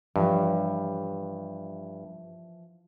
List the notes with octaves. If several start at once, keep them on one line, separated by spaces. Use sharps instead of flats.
G2 E3 F3 C#5